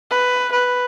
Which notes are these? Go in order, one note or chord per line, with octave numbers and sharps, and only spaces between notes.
B4
B4